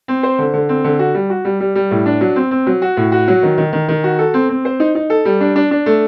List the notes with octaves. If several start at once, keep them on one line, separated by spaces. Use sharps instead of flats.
C4
C5
D3
D3
C4
D3
F#4
G3
F#4
G3
G3
G3
A2
D4
F#3
C4
C4
F#3
F#4
A2
F#4
F#3
D#3
D#3
D#3
D#3
F#4
A4
C4
C4
C5
D#4
D#4
A4
G3
D4
D4
D4
A3